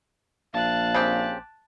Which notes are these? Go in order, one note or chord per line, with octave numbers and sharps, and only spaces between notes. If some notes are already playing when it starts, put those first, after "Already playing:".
A#1 F5 A5 F#6
C#3 C4 G4